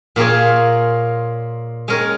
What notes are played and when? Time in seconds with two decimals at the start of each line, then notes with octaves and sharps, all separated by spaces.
0.16 A#2 A#3 F4 G#4 C#5
1.88 G#3 C#4 A#4 C#5